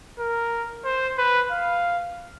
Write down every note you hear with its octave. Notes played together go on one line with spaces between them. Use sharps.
A#4
C5
B4
F5